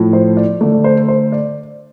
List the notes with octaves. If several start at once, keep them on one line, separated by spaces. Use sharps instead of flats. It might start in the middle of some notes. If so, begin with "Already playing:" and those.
Already playing: A2 F3 A3
C5
D5
D3 A3 D5
D5
C5
A4
C5
D5